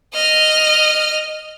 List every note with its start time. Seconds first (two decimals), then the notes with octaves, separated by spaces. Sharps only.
0.14 D#5 F6